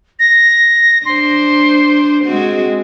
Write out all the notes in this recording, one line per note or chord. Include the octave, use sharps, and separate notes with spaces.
A#6
D4 C5 C6
G#3 C4 F#4